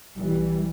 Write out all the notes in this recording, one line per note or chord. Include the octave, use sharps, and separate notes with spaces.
B1 B2 E3 G3